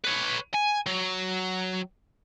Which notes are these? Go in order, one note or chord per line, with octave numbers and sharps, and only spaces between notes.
B4 C#5
G#5
F#3